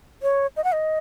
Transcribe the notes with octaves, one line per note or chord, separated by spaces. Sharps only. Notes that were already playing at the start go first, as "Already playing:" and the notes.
C#5
D#5
F#5
D#5